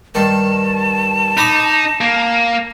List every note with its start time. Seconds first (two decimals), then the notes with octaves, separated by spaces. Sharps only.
0.15 G2 D#3 A5
1.37 D#4 B5 D6 D#6
2.01 A#3